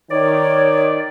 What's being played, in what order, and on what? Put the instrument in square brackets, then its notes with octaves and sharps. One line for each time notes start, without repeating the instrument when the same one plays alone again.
[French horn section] D#3 [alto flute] C#5 [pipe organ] D5